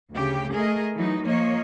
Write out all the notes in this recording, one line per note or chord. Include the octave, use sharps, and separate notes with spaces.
D2 C#3 G4
A3 G#4 A#4 D#5
E3 F#3 D#4
F3 A#3 C#5 D#5